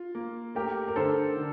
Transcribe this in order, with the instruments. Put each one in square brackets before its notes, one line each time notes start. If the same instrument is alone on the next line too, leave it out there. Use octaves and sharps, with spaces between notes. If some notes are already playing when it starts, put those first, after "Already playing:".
Already playing: [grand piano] F4
A#3
[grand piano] A3 [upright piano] G4 A#4
[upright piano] A#4
[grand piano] D3 [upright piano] A4 C5
[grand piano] D3